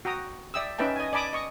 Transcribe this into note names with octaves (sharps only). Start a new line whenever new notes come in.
F#4 G5 A#5 D#6
D5 E5 G5 D#6 E6
C#4 D#4 B4 E5 G5 A5
D#5 G#5
D5 G#5 A5 B5 D6 D#6
D#5 C#6 D#6